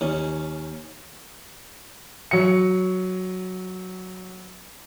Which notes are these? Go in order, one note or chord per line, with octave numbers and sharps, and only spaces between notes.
D#2 C#4
F#3 C#7